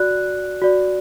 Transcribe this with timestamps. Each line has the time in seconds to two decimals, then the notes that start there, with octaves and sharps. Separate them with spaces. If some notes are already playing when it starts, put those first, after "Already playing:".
Already playing: F#4 D5 F#6
0.62 F#4 D5